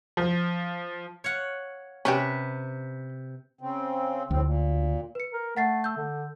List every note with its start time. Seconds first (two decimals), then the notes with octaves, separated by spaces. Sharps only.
0.17 F3
1.24 C#5 F5 F#5
2.05 C3 C#4 G4 B4 B5
3.61 C#3 C4
4.31 D2 A2 C4
4.44 A#2
5.15 B4 C#7
5.33 A#4
5.57 A3 F#5 A6 C7
5.84 E6 G6
5.96 D3